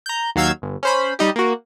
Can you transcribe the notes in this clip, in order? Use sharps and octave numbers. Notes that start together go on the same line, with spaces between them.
A#5 G6
D#2 F#3 F5 E6 G6 G#6
G1
C#4 C5 B5
G3 D#4 G4
A#3 F#4